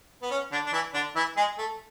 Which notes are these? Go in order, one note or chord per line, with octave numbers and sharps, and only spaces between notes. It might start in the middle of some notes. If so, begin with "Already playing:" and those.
B3
C#4
D3 D4
D4
E3 E4
D3 D4
E3 E4
G#3 G#4
A3 A4